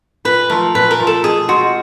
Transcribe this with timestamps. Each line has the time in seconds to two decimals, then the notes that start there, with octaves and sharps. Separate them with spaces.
0.25 A#2 B4
0.50 F3 A3 A#4
0.75 A#2 B4
0.91 A#4
0.99 F3 A3
1.07 A4
1.24 B2 G#4
1.48 G#3 C4 F4 F#4